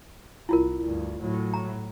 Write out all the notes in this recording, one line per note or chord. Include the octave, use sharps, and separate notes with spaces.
C2 E4 F4 A#4
D2 G2
A2 F#3
A#5